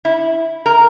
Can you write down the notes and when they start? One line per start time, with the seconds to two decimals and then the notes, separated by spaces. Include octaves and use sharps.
0.05 E4
0.66 A#4